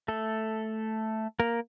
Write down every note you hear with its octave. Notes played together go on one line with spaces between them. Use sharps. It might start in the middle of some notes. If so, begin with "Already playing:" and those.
A3 A4
A#3 A#4